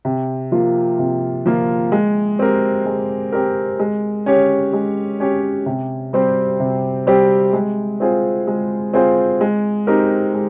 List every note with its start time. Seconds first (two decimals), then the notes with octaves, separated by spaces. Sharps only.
0.05 C3
0.52 F3 A#3 F4
0.99 C3
1.46 F3 A#3 F4
1.92 G#3
2.39 C4 G4 A#4
2.86 G#3
3.32 C4 G4 A#4
3.80 G#3
4.26 C#4 G4 C#5
4.73 G#3
5.20 C#4 G4 C#5
5.66 C3
6.13 G3 C4 G4 C5
6.60 C3
7.07 G3 C4 G4 C5
7.53 G#3
8.00 C4 F4 G#4 C5
8.47 G#3
8.93 C4 F4 G#4 C5
9.41 G#3
9.87 C4 D#4 G4 A#4
10.34 G#3